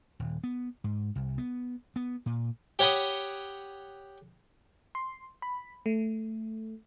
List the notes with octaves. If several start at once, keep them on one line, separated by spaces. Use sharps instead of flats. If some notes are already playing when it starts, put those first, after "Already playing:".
D#1
B3
G#2
C2
B3
B3
A#2
G4 C#5 F#5 G5 B5 D#6
C6
B5
A3